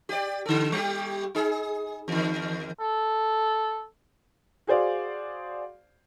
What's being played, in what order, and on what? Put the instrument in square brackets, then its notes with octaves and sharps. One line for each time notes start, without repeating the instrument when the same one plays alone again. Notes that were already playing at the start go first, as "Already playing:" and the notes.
[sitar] G4 D5
D3 A4
G3 G4
D#4 G#4
E2 D#3
[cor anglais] A4
[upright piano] F#4 G#4 C5 D5 F5